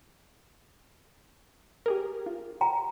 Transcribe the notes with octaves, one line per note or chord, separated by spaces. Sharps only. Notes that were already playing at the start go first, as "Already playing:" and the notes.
G4 G#4 A#4
F4
G5 A#5